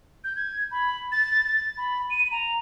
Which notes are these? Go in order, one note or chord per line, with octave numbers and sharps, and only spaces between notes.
G6
G#6
B5
A6
A6
B5
D#7
A#5